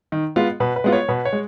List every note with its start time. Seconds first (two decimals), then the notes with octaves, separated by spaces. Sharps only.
0.12 D#3
0.36 G#3 B3 F4
0.60 B2 B4
0.76 B4
0.84 G#3 B3 F4
0.93 C#5
1.08 B2 B4
1.25 C#5
1.33 G#3